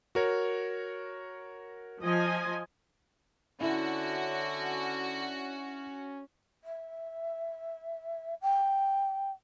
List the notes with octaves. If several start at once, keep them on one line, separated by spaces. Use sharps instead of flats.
F#4 A#4 C#5
F3 D#5 G#5
D3 C#4 E4 F#4
E5
G5